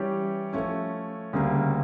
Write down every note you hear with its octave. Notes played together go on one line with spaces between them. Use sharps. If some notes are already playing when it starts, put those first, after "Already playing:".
Already playing: E3 G3 C#4 G4 C#5
F3 A3 C#4 E4
D2 C#3 G3 A#3